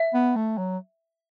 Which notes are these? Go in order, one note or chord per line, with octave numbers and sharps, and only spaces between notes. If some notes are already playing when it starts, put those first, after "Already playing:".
Already playing: E5
B3
A3
F#3